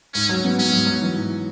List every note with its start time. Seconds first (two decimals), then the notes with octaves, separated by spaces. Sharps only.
0.14 G#2 C#4
0.29 F#3
0.44 B3
0.58 F#3 C#4
0.72 G#2
0.87 F#3
1.02 E3
1.16 G#2